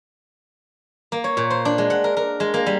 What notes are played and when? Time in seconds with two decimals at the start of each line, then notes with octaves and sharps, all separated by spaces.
1.12 A#3
1.24 C#5
1.37 A#2
1.50 C5
1.65 D4
1.78 G#3
1.90 F#5
2.04 A#4
2.17 A#4
2.40 G#3
2.54 A#3
2.66 G3